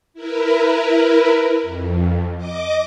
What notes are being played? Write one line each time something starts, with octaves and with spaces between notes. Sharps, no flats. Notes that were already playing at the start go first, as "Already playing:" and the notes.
E4 A#4 B4
F2
D#5 D6